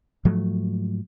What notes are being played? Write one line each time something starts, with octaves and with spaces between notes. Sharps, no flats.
G#2 F3 F#3 A3